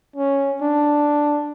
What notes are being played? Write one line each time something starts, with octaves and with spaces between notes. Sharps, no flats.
C#4
D4